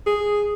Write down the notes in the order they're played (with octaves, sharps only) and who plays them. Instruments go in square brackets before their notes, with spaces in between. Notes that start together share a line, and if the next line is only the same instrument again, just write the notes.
[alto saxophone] G#4